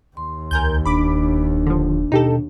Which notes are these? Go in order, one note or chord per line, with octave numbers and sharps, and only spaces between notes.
D#2 C6
C#2 A#4 G#5 G6
E1 D4 B5 D6
D3 F3
B2 D#4 G4 A4